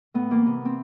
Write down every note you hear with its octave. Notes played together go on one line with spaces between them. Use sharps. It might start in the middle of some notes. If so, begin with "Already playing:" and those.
A2 B3
E3 A#3
C3 B3
E3 C4